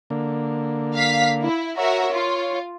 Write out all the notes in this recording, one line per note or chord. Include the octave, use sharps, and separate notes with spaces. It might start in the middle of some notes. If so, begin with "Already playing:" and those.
D3 A#3
F5 B6
E4
F#4 A#4 C#5 E5
F4